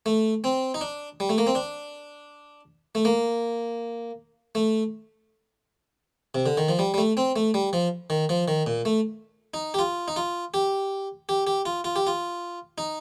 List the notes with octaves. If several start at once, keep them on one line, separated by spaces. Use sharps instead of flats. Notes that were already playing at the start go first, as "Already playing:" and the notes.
A3
C4
D#4
D4
G3
A3
A#3
C4
D4
A3
A#3
A3
C3
D3
D#3
F3
G3
G3
A3
C4
A3
G3
F3
D#3
F3
D#3
A#2
A3
D#4
G4
F4
D#4
F4
G4
G4
G4
F4
F4
G4
F4
D#4